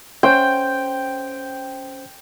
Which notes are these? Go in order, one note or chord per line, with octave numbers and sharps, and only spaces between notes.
C#4 C5 G5 G6